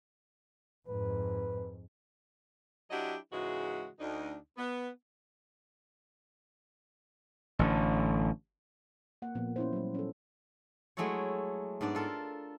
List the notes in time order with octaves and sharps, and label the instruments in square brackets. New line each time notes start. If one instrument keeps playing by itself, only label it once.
[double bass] F2 G#2 [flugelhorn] B4
[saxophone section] F#3 D4 E4 F#4 G4 D#5
G#2 C#3 E3 G#3 F#4
D2 D4 D#4
B3
[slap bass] A1 D3
[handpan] A#3 F#5
A#2 F3 A#3 B3
C#4 E4 C5
F#3 G3
C#4 A4
[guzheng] F#3 G#3 A3 E4 A4 C#5
G#2 B3 D4 D5
F4 A4 A#4